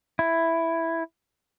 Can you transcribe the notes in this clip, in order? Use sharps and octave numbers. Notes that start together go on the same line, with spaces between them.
E4